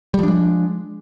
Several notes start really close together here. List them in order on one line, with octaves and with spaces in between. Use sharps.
G3 F3 D4 G#3